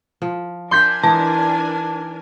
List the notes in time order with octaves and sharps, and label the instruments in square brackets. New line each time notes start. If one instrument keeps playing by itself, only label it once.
[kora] F3
[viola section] D4 A#4 G#5 [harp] C6 G6 B6
[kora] E3 D#4 [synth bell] A5